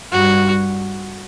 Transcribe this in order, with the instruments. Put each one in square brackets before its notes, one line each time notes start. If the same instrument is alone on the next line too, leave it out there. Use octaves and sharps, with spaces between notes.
[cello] G2 [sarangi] F#4